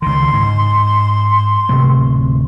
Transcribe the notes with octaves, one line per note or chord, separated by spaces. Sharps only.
C#2 D#3 C6
G#2
D1 C3 A3